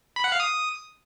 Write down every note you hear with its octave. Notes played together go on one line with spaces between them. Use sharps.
B5
F#5
F5
D#6